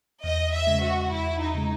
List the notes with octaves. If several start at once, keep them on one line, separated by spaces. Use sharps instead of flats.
E2 D#5
E5
C#3 G#3
F#4
E2 E4
D#4
C#3 G#3